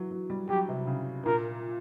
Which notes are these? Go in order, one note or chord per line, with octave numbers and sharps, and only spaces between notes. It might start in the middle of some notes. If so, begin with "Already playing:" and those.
Already playing: E3 F#3
F#3
G3
F#3 G4
C3
C#3
A#2 A#4